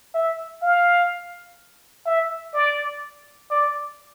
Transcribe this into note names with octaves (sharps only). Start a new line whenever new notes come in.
E5
F5
E5
D5
D5